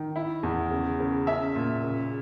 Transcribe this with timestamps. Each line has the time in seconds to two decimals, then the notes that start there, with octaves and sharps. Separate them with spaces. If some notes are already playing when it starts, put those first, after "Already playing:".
Already playing: D#3
0.16 E4
0.43 E2
0.71 C#3
1.00 C#3
1.27 C#4 E5
1.55 A#2
1.84 C#3